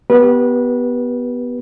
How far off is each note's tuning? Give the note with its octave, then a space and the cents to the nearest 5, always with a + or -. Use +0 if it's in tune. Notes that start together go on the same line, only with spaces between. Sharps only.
B3 +0 G4 -15 B4 -25